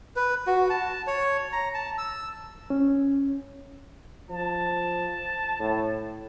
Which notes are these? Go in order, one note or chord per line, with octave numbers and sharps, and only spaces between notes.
B4
F#4
A5
C#5
A#5
A5
E6
C#4
F3 A5
A2